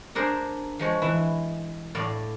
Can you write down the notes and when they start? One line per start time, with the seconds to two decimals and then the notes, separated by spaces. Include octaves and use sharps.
0.15 D4 G#4 A#4 C5
0.79 F3 G#3 C#5
1.02 E3 E4
1.95 A2 D5 F5